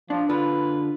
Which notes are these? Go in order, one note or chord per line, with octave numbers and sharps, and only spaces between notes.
F3 D4
D3 F4 B4